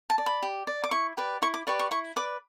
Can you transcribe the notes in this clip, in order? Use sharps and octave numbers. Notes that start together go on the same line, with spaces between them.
A5
D5
B5
G4
D5
D6
E4 C#6
G4 B4 D5
E4 C#6
D6
G4 B4 D5 C#6
C#6
E4 C#6
B4 D5 D6